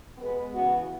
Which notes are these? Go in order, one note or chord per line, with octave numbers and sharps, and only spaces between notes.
B2 G#3 B3 B4
C#3 E3 B3 F#4